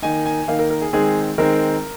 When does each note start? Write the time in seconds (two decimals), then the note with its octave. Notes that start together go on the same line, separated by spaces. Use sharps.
0.02 D#3 A#3 D#4 G#5
0.26 G#5
0.48 D#3 A#3 D#4 F5
0.59 A#4
0.70 A#4
0.82 G#4
0.93 D#3 G#3 C4 G#4
1.38 D#3 G#3 C4 A#4